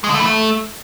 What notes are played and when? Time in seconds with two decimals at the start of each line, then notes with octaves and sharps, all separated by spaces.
0.04 G#3
0.09 D3
0.15 A3
0.20 E3
0.25 A3